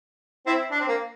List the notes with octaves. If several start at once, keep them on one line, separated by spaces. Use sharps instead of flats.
C4 E4
D4
C4
A#3